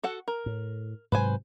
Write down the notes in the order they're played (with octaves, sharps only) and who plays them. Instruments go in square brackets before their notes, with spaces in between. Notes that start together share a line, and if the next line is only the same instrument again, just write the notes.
[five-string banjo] F#4 A4 F#5
A#4
[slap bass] A2
[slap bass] G#2 C3 F#3 [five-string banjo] B4 C5 G#5